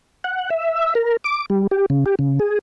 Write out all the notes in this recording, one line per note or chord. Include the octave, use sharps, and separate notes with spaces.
F#5
E5
A#4
D6
G3
G4
C#3
G4
C#3
G#4